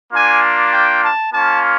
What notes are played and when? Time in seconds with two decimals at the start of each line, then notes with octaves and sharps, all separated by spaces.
0.12 A#3 D4 F4 G#5
0.72 G5
1.03 A5
1.33 A#3 C#4 F4 A5